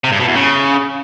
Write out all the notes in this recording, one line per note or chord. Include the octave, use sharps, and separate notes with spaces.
C3
G2
B2
E2
C#3